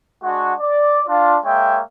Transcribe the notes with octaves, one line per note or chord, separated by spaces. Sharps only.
G#3 D4 F#4
D5
D4 F4
G#3 A#3 C#5 E5 G5